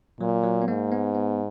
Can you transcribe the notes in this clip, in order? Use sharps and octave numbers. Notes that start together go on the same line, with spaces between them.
A#2 F#3
F#3
B3
G#2 A#3
B3
B3